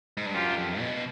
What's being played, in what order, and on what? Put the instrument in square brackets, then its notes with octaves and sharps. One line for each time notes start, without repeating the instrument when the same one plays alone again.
[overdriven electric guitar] G#2
G2
[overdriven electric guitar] F#2 [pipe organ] F4 G4
[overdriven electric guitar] F2
B2